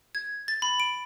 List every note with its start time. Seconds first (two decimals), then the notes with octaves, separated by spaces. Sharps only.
0.15 G#6
0.48 A6
0.62 B5
0.80 D7